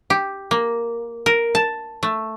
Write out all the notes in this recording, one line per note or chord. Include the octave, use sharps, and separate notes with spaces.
G4
A#3
A#4
A5
A3